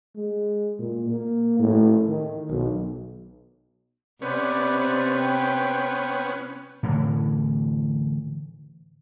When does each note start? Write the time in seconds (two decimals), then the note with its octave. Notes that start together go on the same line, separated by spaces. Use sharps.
0.15 G#3
0.79 A#2
1.09 A#3
1.59 A2
2.08 D#3
2.50 B1
4.22 C3 B3 C#4 B4 C5 D5
5.18 G5
6.83 A2 D3 E3